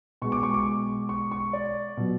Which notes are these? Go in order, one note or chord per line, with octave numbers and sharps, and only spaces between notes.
B2 G#3 C#6
D6
C#6
D6
C#6
C#6
D5
B2 F#3